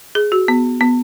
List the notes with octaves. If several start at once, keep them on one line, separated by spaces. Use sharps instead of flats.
G#4
F#4
B3
B3